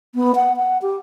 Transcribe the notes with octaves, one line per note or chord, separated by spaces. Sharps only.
B3
F#5
F#5
G4